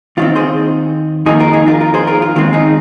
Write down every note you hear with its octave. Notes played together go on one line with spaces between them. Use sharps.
D#2 D#3 C4 F4
G#4 C5
F2 D#3 A#3 D#4 G#4
F4 A#4
D#4 G#4
F4 A#4
F4 A#4
G#4 C5
F4 A#4
F4
D#2 D#3 G#3 C4 F4
D#4 G#4